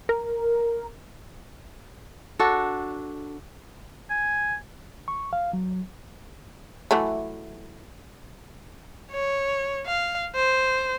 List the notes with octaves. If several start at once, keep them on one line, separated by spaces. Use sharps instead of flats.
A#4
D4 F#4 A4
G#5
C#6
F5
F#3
E3 F#3 A3
C#5
F5
C5